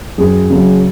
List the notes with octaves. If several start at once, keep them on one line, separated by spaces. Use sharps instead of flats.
F#2 G#4
C#3 F#3